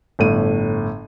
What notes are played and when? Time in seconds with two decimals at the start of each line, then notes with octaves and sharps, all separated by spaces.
0.19 G1 A2 D#7